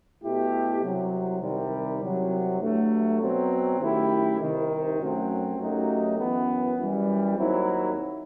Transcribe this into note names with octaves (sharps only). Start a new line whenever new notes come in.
B2 A3 E4 G4
C2 C3 F#3
C2 C3 D#3 G3
C2 C3 F#3
G2 F#3 A3
B2 F#3 C4
F#2 D#3 A3 E4 G4
C2 C3 D#3
F#2 F#3 A3 C4
F#2 F#3 A3 D#4 G4
F#2 E3 B3
F#2 E3 G3
D#2 D#3 F#3 C4 E4